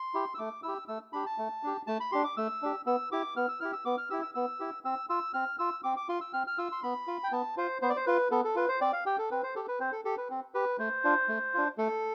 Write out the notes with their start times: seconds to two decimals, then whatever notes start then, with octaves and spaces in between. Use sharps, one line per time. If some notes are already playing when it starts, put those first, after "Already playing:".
Already playing: C6
0.14 E4 G4
0.35 E6
0.38 A3 D6
0.63 E4 G4 E6
0.88 A3 E6
1.13 D4 G4 B5
1.26 A5
1.38 A3
1.63 D4 G4
1.87 A3 A5
2.00 B5
2.12 D4 G4 C6
2.24 D6
2.37 A3 E6
2.62 D4 G4
2.86 B3 E6
3.12 E4 G4 D6
3.36 B3 F6
3.48 E6
3.60 E4 G4 F6
3.73 E6
3.85 B3 D6
3.98 F6
4.10 E4 G4 E6
4.22 E6
4.35 B3 E6
4.60 E4 G4
4.85 C4 E6
5.09 F4 E6
5.34 C4 F6
5.59 F4 E6
5.84 C4 D6
5.97 D6
6.09 F4 C6
6.21 E6
6.33 C4 F6
6.47 F6
6.58 F4 E6
6.72 C6
6.83 B3 B5
7.07 F4
7.24 G5
7.32 B3 A5
7.57 F4 C5
7.82 B3 C5
7.90 D5
7.96 C5
8.06 F4 B4
8.31 B3 A4
8.45 A4
8.56 F4 B4
8.69 C5
8.81 C4 D5
8.93 F5
9.06 G4 G5
9.18 A4
9.31 C4 B4
9.43 C5
9.55 G4 A4
9.68 B4
9.80 C4 C5
9.92 A4
10.05 G4 A4
10.17 B4
10.30 C4
10.54 G4 B4
10.79 A3 C5
11.04 D4 F4
11.29 A3
11.54 D4 F4
11.78 A3 A4